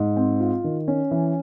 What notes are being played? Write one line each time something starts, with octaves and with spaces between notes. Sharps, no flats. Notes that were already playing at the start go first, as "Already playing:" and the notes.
Already playing: G#2
C4
F4
D#3
C#4
E3